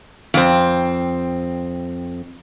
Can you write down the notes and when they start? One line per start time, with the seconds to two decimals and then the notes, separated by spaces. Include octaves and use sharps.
0.34 F2 C4